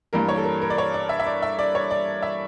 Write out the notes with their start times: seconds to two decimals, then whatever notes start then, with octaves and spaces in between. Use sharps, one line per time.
0.13 G2 E3 G3 A#3 A#4
0.29 C#5
0.37 A4
0.45 A#4
0.62 A#4
0.70 D5
0.78 C#5
0.94 D5
1.09 E5
1.20 E5
1.27 D5
1.42 E5
1.59 D5
1.75 C#5
1.91 D5
2.22 E5